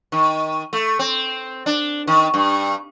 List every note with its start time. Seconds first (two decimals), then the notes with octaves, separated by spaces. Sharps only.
0.12 D#3
0.73 A3
0.99 C4
1.66 D4
2.07 D#3
2.34 G2